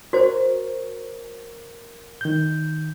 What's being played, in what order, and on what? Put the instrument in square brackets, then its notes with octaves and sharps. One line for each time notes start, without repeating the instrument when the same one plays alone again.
[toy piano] F#4 C5 [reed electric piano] A#4 C#5
[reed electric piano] D#3 G6